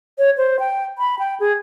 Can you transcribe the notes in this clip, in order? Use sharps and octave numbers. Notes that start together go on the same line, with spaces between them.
C#5
C5
G5
B5
G5
G#4